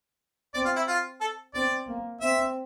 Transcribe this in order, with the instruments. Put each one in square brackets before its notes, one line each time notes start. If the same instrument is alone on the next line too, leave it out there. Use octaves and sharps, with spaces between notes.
[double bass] C4 [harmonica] D5
[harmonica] F4
E4
F4
A4
[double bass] C4 [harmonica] D5
[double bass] A#3
[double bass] C4 [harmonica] E5